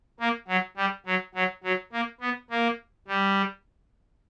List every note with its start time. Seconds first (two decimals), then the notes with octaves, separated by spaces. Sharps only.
0.20 A#3
0.48 F#3
0.77 G3
1.06 F#3
1.35 F#3
1.63 F#3
1.92 A#3
2.21 B3
2.50 A#3
3.07 G3